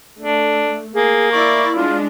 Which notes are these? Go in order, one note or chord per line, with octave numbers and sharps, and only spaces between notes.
A3 D4
A#3 G#4
E4 D5 C#6
G#3 D4 F4